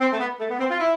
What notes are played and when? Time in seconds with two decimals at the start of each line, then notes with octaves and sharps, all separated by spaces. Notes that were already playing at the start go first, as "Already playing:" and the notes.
0.01 C4
0.13 A3
0.20 B3
0.40 A3
0.50 B3
0.60 C4
0.71 F4
0.80 E4